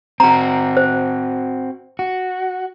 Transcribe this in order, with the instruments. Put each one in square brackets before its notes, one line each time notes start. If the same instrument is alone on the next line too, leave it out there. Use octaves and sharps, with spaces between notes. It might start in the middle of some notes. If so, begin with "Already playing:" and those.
[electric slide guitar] C4 F#4 [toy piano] A#5
[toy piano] C5
[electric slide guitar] F#4